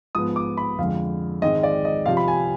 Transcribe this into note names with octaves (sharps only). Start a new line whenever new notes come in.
G#2 F3 B3 D#6
D6
B5
F2 D3 G#3 F5
G#2 D#3 G#3 C4 D#5
D5
D#5
C3 F3 C4 F5
B5
G#5